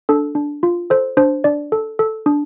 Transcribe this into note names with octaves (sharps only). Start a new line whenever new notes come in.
D4 A4
D4
F4
A4 C5
D4 C5
D4 D5
A4
A4
D4